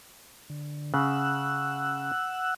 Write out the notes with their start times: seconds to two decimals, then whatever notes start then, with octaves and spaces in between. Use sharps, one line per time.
0.50 D3
0.94 C#3 F#5 E6 F#6